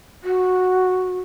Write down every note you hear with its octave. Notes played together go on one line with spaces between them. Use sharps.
F#4